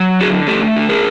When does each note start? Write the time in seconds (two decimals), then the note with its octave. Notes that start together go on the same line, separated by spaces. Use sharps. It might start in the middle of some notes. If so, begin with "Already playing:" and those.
Already playing: F#3
0.20 D3 F#4 G#4
0.47 A3 G4 A4
0.76 D3
0.89 G#4 A#4